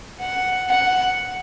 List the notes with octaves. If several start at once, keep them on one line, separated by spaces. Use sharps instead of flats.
F#5
F#5